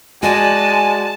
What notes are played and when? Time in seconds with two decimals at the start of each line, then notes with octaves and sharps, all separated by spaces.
0.23 G#3 F#4 D5 G#5 A5